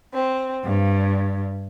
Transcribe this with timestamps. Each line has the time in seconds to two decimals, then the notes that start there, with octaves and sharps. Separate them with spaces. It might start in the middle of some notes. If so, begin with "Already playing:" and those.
0.12 C4
0.65 G2